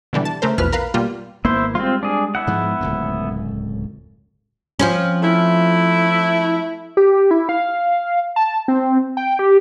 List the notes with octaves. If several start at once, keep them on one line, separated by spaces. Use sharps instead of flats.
B2 D3 E3 G3
A5
C#3 A3 A#4 C5
A#1 E2 B2 B4 F6
A#4 B4 F5
B2 G3 A#3 F4
G#1 A#3 B3 E4 C5
G3 G#3 C4 F4
D4 G#4
B3 E4 F#5
G#2 F3 G#3
D1 C#2 F#2
F3 C4 C#4
A3 E4
G4
E4
F5
A5
C4
G5
G4